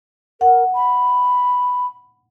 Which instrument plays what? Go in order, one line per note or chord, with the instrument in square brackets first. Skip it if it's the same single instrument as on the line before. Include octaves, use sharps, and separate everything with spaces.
[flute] A#4 [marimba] F#5
[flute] B5